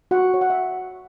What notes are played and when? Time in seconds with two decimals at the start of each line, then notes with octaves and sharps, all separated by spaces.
0.11 F#4 F#5
0.34 C#5
0.41 F#5
0.50 E5